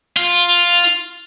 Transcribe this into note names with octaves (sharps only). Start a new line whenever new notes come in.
F4